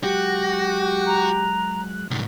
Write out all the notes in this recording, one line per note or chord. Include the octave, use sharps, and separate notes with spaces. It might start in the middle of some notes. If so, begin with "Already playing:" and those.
F#3 G#3 F#4 G4 F#6
A#5
C2 G#2